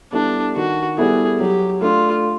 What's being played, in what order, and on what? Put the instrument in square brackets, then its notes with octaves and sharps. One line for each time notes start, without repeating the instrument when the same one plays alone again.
[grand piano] G3 B3 E4 A4 [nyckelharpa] D4
[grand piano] D#3 [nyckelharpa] F#4
[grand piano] G3 B3 E4 A4 [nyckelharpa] G#4
[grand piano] F#3 [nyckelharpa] G4
[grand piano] A3 D4 [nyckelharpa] F4